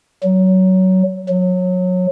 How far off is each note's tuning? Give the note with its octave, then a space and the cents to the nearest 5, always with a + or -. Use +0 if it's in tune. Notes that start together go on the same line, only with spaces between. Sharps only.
F#3 +15
F#3 -25